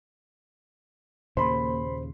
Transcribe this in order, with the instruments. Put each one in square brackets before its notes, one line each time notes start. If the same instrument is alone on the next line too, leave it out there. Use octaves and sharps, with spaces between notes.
[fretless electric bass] D#2 A#2 C#3 [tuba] A#3 [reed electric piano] C5 [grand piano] B5 C6